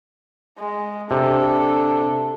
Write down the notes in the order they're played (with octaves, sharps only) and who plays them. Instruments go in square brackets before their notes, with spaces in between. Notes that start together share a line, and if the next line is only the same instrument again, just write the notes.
[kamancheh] G#3
[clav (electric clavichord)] C3 [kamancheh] D4 A4